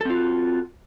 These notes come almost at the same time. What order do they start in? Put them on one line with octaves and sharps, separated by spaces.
A4 C4 F4 F#4